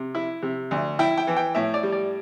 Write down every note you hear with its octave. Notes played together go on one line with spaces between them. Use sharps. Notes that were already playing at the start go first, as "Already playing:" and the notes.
Already playing: C3
E4
C3
D2
E4 G5
G5
E3
G5
A2 E5
D5
G3
D5